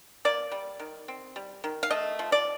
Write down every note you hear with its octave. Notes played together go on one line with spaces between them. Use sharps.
A#3 D5
G3
D#3
C4
G3
D#3
F5
A3 D#5
F3
D5